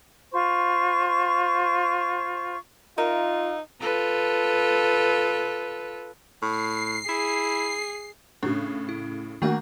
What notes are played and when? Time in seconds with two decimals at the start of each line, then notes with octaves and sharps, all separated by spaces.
0.31 F4 C5 C#6
2.98 D#4 F4 A#4 E5
3.81 F4 A4 B4
6.42 A2 C7
7.08 E4 G#4
8.43 A2 C#3 D4
8.89 E4
9.42 D3 D#3 A3 A#3 F#4 F#5